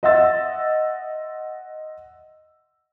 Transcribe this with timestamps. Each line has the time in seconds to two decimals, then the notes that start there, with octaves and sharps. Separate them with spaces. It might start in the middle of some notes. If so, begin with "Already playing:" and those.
0.03 D#5 E5 F#5 C6 E6 A6